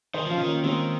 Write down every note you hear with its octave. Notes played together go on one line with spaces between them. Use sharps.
D#3 C5 D#5
F3 C#4 F4
D#3
A#3 C#4
D#3 G#3 C4